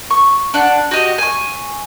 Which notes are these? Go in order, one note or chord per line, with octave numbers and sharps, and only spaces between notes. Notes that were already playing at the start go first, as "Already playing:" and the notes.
C#6
D4 F#5
F#4 G4 D#5
G#5 C#6